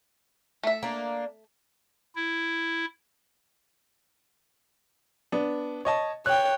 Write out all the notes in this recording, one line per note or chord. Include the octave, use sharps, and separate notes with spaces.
A3 E5
A#3 D4
E4
B3 D4
C#5 D#5 A5
C#5 G5 F#6